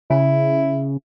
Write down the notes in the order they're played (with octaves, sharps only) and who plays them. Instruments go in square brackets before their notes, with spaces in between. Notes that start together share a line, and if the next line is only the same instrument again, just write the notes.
[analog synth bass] C#3 [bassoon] E4